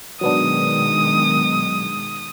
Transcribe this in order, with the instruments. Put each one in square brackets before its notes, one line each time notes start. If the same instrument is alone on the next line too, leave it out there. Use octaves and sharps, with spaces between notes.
[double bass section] B2 D#3 G#3 [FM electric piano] F#3 B3 D4 [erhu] D#6